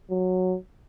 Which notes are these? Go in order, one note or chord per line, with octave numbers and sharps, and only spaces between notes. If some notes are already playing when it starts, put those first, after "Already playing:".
F#3